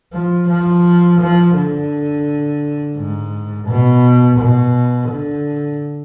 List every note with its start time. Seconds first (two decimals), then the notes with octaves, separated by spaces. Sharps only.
0.13 F3
0.48 F3
1.19 F3
1.55 D3
2.96 G#2
3.67 B2
4.39 B2
5.09 D3